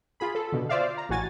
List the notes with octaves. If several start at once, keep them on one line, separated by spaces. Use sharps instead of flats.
F4 G#4 B5
A4
B2 D3
F4 C5 D5 E5 F5
A#5
A1 A2 F#4 G#5 A6